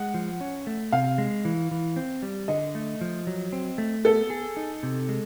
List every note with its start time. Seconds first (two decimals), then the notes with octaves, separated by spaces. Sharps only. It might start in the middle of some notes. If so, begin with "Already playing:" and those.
Already playing: G#3 F#5
0.14 F3
0.41 C#4
0.67 A3
0.92 C3 F5
1.18 G#3
1.45 E3
1.71 E3
1.96 C4
2.22 G3
2.48 D3 D#5
2.75 A3
3.01 F3
3.27 F#3
3.53 C4
3.78 A3
4.04 B3 A4
4.30 G#4
4.57 D#4
4.83 C3
5.09 G#3